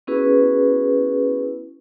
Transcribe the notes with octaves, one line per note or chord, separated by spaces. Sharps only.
B3 C#4 E4 F#4 G#4 B4